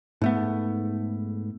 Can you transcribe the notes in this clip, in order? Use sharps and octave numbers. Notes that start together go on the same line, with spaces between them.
G#2 A3 B3